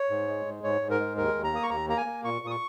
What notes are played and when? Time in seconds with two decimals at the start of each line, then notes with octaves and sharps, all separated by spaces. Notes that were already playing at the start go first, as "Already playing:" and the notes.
Already playing: C#5
0.10 G#2
0.28 G#3
0.45 G#2
0.64 G#2 C#5
0.81 G#2
0.90 A#4
1.00 G#3
1.17 D#2 A#4
1.35 D#2
1.44 A#5
1.53 A#3 D#6
1.63 C#6
1.70 D#2 A#5
1.88 A#3 A#5
1.97 G#5
2.06 A#3
2.24 A#2 C#6
2.42 A#2 D#6
2.51 C#6